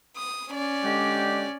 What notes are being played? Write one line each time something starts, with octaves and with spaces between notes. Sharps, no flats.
D#6
C#4 D5
D3 G#3 G4